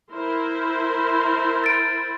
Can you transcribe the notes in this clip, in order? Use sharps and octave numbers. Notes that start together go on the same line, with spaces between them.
E4 A#4 C5
A6 D7